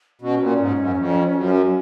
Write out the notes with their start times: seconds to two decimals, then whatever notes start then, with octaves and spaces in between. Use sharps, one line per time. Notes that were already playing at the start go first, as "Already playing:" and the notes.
0.22 B2 C#4
0.41 A#2
0.59 G#2
0.79 F#2
0.97 F2
1.35 F#2